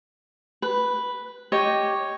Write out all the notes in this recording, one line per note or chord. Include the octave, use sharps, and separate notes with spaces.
B4
G4 C#5 D#5